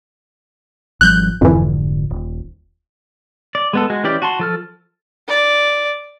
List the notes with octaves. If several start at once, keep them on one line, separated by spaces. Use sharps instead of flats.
G#1 F3 G3 F#6 G6
F1 F2 G#2 D3 E3
D#1
D5
G#3 B3 A4
G#3 F#4
E3 C#4 G4 D5
F#4 A5 C6
F3 A4 F6
D5